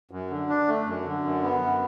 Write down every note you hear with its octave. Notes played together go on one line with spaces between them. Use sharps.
F#2
D3
D4
A3
F#2
D3
F#2
B3
F#2